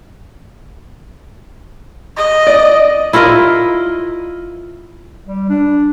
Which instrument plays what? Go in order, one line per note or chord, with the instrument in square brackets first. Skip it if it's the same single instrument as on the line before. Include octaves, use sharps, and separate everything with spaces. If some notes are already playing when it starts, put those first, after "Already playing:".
[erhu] D#5
[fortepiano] D5
[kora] E4 F4 A#4 D#5
[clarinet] G3
D4